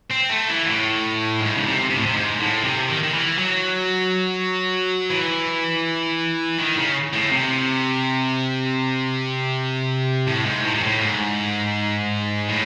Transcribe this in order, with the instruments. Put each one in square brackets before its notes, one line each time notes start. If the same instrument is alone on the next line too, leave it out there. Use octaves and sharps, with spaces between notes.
[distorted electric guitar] C4
A3
E3
A2
G#2
C#3
C3
C3
A2
C3
G#2
A2
C3
D#3
D#3
E3
F#3
E3
D#3
C#3
A2
C3
A2
G#2
A2
C3
A2
G#2
A2